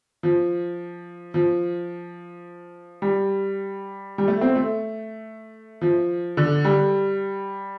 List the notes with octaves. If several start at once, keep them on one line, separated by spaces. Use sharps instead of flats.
F3
F3
G3
G3
A3
C4
A3
F3
D3
G3